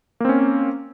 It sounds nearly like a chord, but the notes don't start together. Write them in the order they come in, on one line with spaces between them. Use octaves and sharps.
A#3 C4 C#4